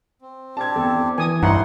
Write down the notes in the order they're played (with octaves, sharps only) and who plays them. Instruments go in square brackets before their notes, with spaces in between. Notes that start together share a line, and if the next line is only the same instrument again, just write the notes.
[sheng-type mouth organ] C4
[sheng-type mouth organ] C4 D4 G4 [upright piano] A5 G#6
[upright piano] E2 [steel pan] A4
[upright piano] E3 [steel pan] G#5 D#6
[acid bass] G2 [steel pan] D#4 E4 F#5 [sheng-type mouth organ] C5 C#5 C6 [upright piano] A#5